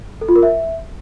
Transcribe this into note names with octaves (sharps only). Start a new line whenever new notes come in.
A4
F4
A#4
E5